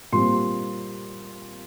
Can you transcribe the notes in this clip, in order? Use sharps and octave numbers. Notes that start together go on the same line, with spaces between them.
A#2 G3 C4 C6